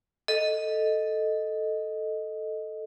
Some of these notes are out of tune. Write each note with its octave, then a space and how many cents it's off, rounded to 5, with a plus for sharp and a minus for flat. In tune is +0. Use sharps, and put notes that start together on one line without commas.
A4 +0 D#5 +0